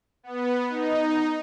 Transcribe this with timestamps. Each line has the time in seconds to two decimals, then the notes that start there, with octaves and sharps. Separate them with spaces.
0.23 B3
0.69 D#4